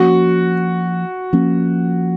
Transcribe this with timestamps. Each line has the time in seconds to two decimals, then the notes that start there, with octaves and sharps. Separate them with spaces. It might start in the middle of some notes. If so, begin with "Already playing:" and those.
Already playing: F3 A#3 C#4 F#4
1.33 F3 A#3 C#4